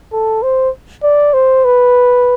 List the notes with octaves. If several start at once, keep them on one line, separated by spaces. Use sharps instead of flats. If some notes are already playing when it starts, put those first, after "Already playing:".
A4
C5
D5
C5
B4